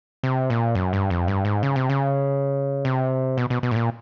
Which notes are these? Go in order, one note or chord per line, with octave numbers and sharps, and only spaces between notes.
C3
A#2
F#2
G2
F2
G2
G#2
C#3
C3
C#3
C3
B2
B2
B2
A2
A#2